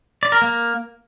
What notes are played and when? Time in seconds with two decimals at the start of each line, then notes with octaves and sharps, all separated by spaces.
0.23 D5
0.32 A#4
0.42 A#3